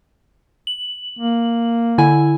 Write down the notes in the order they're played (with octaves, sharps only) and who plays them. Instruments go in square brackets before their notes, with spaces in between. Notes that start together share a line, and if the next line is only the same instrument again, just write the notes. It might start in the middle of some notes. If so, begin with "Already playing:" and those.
[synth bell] F#7
[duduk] A#3
[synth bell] D3 E4 G#5